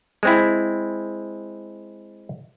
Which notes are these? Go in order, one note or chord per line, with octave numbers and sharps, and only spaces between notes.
G#3 C4 E4